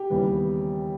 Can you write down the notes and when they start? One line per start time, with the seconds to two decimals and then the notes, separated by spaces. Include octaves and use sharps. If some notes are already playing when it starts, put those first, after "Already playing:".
Already playing: G4
0.10 D#2 C#3 E3 G3 B3